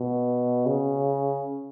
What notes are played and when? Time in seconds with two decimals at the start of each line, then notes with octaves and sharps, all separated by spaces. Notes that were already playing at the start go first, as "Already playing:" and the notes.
Already playing: B2
0.66 C#3